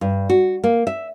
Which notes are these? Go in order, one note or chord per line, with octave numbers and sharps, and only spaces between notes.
G2
F#4
A#3
E5